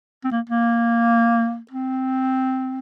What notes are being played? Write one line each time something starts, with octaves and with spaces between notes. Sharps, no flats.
C4
A#3
A#3
C4